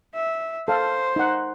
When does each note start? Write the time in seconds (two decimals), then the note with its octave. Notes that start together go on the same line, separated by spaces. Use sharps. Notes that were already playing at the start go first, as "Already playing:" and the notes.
0.14 E5
0.68 A4 C5 F5
1.16 D#4 F#5